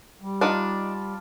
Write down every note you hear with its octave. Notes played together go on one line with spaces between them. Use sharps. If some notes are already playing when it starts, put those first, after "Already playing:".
G3
D4 D#4 F4 D5 F#5 A5